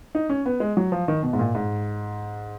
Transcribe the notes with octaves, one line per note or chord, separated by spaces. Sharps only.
D#4
C#4
B3
G#3
F#3
F3
D#3
B2
G#2
A#2
G#2